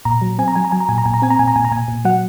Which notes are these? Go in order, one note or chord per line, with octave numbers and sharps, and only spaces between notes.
A#2 A#5
F#3
C4 G#5
A#5
F#3 G#5
A#5
F#3 G#5
A#5
A#2 G#5
A#5
A#2 G#5
A#5
C4 G#5
A#5
A#2 G#5
A#5
A#2 G#5
A#5
A#2 G#5
A#2
F#3 F#5